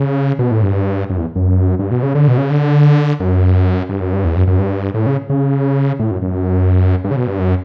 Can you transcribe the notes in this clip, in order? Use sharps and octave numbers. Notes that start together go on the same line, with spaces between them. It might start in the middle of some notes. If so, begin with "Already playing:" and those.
Already playing: C#3
B2
A2
G2
F#2
E2
F#2
G2
B2
C#3
D3
B2
C#3
D3
F#2
G2
F#2
G2
E2
F#2
F#2
G2
A2
C#3
C#3
A2
F#2
F#2
G2
C#3
B2
G2
F#2